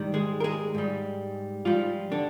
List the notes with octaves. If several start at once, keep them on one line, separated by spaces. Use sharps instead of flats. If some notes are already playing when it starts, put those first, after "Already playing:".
Already playing: G#2 D#3 G3
G#3 G#4
A#4
G#3 G#4
G#2 G3
G#2 F3 G3 F4
D3 D4